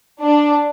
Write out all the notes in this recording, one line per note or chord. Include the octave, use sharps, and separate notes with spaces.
D4